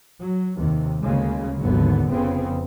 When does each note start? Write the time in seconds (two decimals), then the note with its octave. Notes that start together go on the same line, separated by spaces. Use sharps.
0.21 F#3
0.59 D#2 C3
1.05 D2 C#3 G#3 A#3
1.62 G#1 D#2 D3 F#3 B3
2.10 F1 F2 C#3 B3 C4